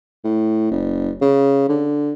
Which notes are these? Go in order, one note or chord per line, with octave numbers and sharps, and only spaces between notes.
A2
F#1
C#3
D3